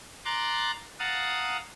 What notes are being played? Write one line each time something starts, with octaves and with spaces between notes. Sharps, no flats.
A#5 C6 D6 F#6 A6
F5 F#5 A5 A#5 D#6